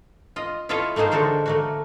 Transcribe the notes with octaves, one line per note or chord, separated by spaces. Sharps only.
F4 D#5
E4 F4 A4 C#5 D#5 F5
A3 A#3 D#4 G#4 C5
D3 G#3 F#4 A4 A#4 C5
A3 A#3 F#4